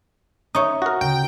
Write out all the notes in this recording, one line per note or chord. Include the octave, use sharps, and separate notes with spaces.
D#4 C#5 E5 D#6
F#4 A#4
D2 C#3 G5